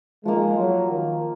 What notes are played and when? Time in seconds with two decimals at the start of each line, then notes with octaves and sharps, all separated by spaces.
0.25 F3 G#3 A#3 D#4
0.58 F#3
0.89 D#3